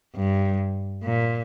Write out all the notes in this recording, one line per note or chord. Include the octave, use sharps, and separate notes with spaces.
G2
A#2